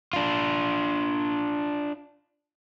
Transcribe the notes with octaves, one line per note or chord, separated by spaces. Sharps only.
D4 F4